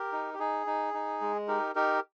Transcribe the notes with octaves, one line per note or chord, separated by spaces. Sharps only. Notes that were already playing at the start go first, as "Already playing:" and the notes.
Already playing: G4 A#4
D#4
G4
D#4 G#4
D#4
D#4
G#3
D#4 G4 A#4
D#4 G4 A#4